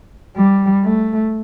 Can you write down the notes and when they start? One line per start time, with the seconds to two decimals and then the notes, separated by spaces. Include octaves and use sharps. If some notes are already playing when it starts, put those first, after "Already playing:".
0.37 G3
0.84 A3